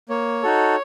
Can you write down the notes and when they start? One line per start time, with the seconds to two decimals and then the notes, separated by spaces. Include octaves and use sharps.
0.09 A#3 C#5
0.43 D#4 F#4 A4